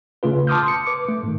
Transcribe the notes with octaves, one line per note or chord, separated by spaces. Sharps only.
C#3 A3 F4 B4
A5 C6 D6 D#6 F6 G6
C#7
B4 D6
A3
G#2 D#3